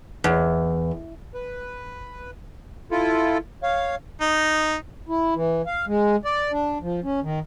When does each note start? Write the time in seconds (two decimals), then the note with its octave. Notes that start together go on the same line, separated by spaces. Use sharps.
0.24 E2
1.34 B4
2.91 E4 F4 A4
3.63 C#5 F5
4.21 D#4
5.09 E4
5.36 E3
5.66 F5
5.87 G#3
6.25 D5
6.52 D4
6.82 F3
7.04 C#4
7.23 D#3